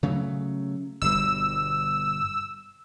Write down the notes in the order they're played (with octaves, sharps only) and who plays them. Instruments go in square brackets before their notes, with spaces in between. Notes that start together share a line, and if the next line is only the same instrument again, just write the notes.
[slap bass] C#3 F#3 A3
[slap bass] G1 B2 G3 [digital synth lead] E6